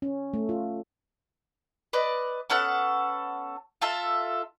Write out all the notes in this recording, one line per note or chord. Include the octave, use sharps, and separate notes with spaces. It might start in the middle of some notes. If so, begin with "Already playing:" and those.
C#4
A3
F4
B4 D5 D#5
B3 C#4 A4 F#5
F4 A4 E5